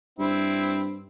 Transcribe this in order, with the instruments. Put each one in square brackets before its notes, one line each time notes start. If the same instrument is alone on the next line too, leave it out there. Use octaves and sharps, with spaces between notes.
[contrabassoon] G2 [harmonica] C4 E4